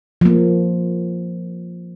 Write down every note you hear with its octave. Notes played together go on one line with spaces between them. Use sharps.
F3 A#3